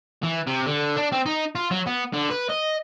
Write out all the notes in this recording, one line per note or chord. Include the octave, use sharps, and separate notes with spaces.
E3
C3
D3
D4
C4
D#4
F4
F#3
B3
D3
B4
D#5